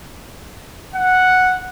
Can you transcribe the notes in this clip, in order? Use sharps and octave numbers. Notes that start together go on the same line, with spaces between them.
F#5